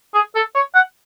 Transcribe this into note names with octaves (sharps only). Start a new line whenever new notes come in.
G#4
A4
C#5
F#5